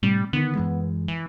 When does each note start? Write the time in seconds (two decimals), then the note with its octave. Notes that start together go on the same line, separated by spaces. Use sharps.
0.03 A2 C3 G3
0.33 D3 D#3 B3
0.55 F#2 E3 G#3
1.08 E3